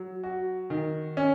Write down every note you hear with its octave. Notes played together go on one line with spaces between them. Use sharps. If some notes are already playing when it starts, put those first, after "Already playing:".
Already playing: F#3
F#4
D#3
C#4